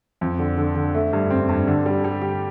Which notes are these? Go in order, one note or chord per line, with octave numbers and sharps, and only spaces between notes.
F2
D3
D3
D3
A3
G2
C4
G2
D3
G3
G3
G4